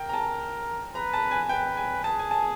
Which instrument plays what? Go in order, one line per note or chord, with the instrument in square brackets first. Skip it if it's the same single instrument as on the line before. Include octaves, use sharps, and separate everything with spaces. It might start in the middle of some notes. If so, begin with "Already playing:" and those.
Already playing: [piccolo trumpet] A#4 [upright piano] G5
[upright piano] A#5
A5
[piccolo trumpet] B4 [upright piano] A#5
[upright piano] A5
G#5
[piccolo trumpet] B4 [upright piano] G5
[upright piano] G#5
[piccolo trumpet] G#4 [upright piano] A5
[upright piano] G#5
A5